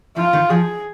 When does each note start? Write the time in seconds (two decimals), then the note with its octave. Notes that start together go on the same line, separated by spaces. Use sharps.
0.16 F3 F4
0.33 D#3
0.50 F3 G#4